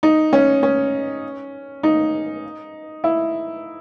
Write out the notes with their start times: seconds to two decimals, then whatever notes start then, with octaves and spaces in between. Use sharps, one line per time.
0.03 D#4
0.33 C#4
0.63 C#4
1.83 D#4
3.04 E4